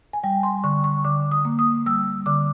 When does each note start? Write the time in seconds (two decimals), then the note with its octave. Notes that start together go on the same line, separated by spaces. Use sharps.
0.13 G#5
0.23 G3 G5
0.43 C6
0.64 D3 C#6
0.84 C#6
1.04 D3 D6
1.32 D#6
1.45 A#3
1.59 D#6
1.86 G3 E6
2.26 D3 D6